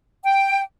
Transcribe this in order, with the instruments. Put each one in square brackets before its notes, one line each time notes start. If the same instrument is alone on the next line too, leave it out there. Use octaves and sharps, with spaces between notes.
[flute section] G5